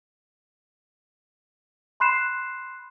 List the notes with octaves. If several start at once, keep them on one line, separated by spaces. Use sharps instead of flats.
B5 C6 F#6 C7 E7